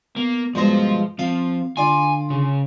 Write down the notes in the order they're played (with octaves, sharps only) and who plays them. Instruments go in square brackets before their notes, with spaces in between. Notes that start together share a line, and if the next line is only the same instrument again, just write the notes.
[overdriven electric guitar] A#3 [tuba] B3
[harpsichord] G2 G#3 A#5 [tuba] B2 [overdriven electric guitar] F3 C5
[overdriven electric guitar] F3 [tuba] C4 [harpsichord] F5
[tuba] D3 [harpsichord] F4 D5 [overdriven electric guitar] G#5
[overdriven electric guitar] C#3